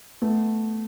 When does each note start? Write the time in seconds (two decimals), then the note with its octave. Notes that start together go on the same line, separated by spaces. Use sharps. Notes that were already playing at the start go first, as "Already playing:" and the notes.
0.22 A3 B3